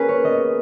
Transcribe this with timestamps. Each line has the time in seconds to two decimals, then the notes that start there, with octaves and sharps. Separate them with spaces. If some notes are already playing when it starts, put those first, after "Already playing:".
Already playing: A#3 C#4 G#4 B4
0.09 C#5
0.24 B3 D#5